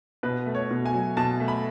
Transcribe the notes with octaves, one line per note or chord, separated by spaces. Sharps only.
B2 B4
A3
C#5
B2
G#5
F#3
B2 A5
A3
B5